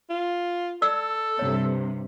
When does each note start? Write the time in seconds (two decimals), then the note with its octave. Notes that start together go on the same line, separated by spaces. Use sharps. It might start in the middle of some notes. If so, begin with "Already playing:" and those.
0.10 F4
0.82 A4 D5 E6
1.39 G2 C3 C#5